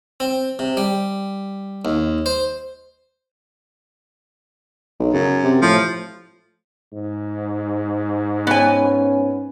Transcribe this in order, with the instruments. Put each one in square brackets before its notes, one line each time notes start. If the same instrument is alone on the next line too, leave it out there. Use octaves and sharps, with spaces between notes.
[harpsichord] C4
C3
G3
D#2
C5
[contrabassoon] B1
[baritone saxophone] F#2 [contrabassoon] C#3
[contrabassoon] C3
[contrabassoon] A2 [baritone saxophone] F3
[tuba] G#2
[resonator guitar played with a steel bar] B3 G#5 [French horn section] C#4